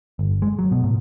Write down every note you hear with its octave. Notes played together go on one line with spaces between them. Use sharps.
G1
G#3
F#3
B2
A2